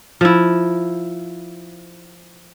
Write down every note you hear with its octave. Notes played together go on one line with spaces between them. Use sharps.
F3 E4